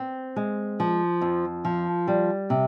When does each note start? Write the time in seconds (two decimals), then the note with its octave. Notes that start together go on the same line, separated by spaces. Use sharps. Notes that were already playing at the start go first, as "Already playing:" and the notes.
Already playing: C4
0.36 G#3
0.80 F3
1.21 F2
1.65 F3
2.08 G3
2.50 C3